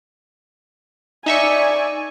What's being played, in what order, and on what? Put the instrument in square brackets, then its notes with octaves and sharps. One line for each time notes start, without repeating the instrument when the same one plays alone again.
[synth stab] D#4 E5 C#6 [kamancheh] D5 G#5